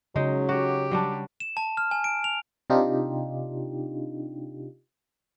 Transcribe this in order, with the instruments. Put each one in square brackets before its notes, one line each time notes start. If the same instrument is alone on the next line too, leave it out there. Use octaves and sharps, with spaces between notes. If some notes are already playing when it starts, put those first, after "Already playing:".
[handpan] C#3 [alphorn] F#3 [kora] G#3 D#4
[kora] F#4 [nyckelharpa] G4
[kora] F#3 G3 D4
[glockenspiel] E7
A5
F6
G#5
D7
F7
[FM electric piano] C3 D4 D#4 F4 G4